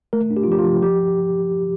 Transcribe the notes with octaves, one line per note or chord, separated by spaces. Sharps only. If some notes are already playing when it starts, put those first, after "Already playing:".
A3 A#4
D4
G4
F4
F3 G4
F4
F3
F3 G4